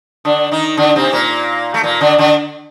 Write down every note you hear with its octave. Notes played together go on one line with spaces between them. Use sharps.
D3 D4
D#3 D#4
D3 D4
C3 C4
A#2 A#3
A3
A#2 A#3
D3 D4
D3 D4